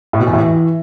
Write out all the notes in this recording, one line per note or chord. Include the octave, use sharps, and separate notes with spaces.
A2
B2
E2
A2
E3